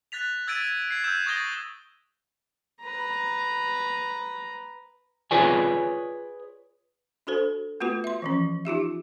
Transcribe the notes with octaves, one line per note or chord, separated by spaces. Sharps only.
F#6 A6 B6 F7
E6 G#6 A6 B6 D7 D#7
G#6 C7
E6 G6 G#6 E7
C#6 D#6 A6 A#6 G7
B4 A#5
F4 G#4 B4 C#5 D5 G#5
D4 F#4 A4 C5
A3 B3 F4 F#4 B4
E5 C6
E3 F3 C#4
D#4 F4 G4 E5